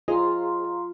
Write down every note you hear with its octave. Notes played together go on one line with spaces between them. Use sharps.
F4 G#4 C5 D#5 F5 A#5 C6